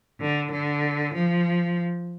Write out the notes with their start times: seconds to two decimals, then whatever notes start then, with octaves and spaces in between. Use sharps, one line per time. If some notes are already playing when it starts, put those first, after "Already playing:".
0.20 D3
0.52 D3
1.14 F3